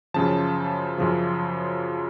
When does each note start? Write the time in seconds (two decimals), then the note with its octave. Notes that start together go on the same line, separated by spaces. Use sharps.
0.14 F#2 C#3 F3 A5
0.98 F#2 C#3 F3